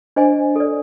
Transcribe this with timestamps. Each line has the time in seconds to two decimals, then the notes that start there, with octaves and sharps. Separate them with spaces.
0.16 D4 C5 D#5 G#5
0.56 A4 D5